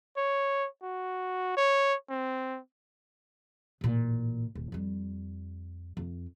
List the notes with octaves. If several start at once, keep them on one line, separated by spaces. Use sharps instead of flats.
C#5
F#4
C#5
C4
A1 A#2
D#1
F2 G3
F2